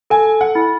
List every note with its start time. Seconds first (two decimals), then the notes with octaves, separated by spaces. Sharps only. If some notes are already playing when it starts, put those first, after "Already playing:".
0.10 A4 G#5
0.41 F#5
0.55 E4